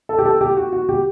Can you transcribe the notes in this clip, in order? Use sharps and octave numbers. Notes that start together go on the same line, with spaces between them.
A4
G4
A4
G4
F#4
F#4
G4